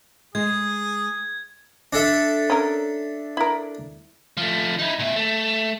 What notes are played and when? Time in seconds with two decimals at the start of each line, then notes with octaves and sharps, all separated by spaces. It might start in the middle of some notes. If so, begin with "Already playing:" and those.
0.35 G#3 G#4 D#6 G#6
1.93 D4 A4 E5
2.50 C#4 A#4
3.37 E4 A#4
4.37 F3 A3
4.79 D#4 E4
4.99 A#2 E5
5.16 A3